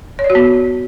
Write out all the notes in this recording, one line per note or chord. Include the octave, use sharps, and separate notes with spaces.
C#5
D5
F#4
B3